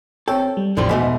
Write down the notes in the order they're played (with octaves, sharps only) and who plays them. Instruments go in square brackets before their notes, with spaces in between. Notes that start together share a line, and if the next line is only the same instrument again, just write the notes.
[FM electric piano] C4 C#5 G5 [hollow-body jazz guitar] A4
[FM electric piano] G3
[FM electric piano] A1 E2 E3 [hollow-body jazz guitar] D3 F3 G3
[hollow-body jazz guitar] G#2 B2 A3 [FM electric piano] B5